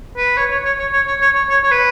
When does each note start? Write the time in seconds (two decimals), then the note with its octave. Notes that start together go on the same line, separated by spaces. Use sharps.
0.17 B4
0.37 C#5
0.50 C#5
0.65 C#5
0.79 C#5
0.93 C#5
1.07 C#5
1.22 C#5
1.35 C#5
1.50 C#5
1.64 C#5
1.71 B4